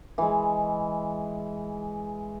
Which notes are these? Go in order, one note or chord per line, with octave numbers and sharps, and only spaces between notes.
E3 G#3